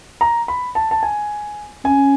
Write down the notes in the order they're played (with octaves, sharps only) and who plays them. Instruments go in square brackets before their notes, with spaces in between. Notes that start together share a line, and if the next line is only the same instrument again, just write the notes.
[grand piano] A#5
B5
A5
A5
G#5
[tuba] C#4 [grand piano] G#5